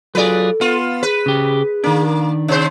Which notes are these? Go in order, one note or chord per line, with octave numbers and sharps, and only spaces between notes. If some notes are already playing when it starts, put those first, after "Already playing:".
F#3 F4 G#4 A4 B4 D5
B3 F4
G#4 B4
C#3 G4
D#3 A#3 D4
C3 C5